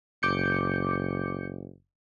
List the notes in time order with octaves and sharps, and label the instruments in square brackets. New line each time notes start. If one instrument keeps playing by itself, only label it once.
[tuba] F#1 [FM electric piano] D6 G6 C#7